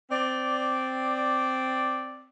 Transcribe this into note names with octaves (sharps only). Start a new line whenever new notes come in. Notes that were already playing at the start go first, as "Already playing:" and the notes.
C4 D5